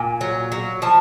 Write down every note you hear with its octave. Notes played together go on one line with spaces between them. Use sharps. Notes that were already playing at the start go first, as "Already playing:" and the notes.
Already playing: A#2 G#5
F#3
F#3
F3 A5